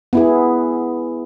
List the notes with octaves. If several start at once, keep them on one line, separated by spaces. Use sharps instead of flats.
B3 E4 G#4